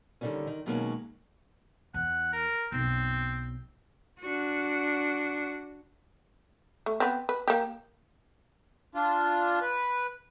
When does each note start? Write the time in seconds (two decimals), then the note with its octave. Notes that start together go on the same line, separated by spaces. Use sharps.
0.21 D3 D#3 F#3 G3 C#4
0.47 D#3
0.66 B2 D#3 F#3 G#3 A#3 C#4
1.94 E2 E3 F#5
2.33 A#4
2.72 B1 F#2 C4
4.20 D4 F#4
6.86 A3
7.00 B3 C4
7.29 B4
7.48 A#3 G4
8.95 D4 F4
9.62 B4